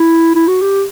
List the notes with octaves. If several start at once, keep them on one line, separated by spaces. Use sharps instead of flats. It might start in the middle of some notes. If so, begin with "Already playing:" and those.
Already playing: E4
E4
F#4
G4